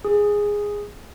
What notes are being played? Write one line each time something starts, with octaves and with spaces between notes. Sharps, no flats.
G#4